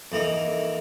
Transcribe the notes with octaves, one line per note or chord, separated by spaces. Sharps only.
F2 E3 A#3 D#4